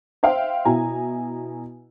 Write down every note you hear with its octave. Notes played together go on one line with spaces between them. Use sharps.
C5 E5 F5 G5
B2 E4 G#5 A#5